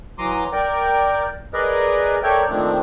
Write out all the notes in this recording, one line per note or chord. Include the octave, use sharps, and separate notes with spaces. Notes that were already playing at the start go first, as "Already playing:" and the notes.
E3 F#3 A#5 C6 D6 D#6
A#4 D5 G5
G#4 A#4 B4 D5 D#5
A4 A#4 C#5 D5 E5 G5
D#3 F3 A3 A#3 C4 D4